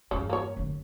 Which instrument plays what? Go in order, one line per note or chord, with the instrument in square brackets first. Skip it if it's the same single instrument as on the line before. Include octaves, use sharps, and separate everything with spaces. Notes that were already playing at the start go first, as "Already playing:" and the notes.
[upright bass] E2 G2 [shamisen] C#3
[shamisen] A#3 C#5
[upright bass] F1 D3